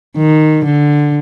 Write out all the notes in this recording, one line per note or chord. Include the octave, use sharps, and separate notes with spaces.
D#3
D3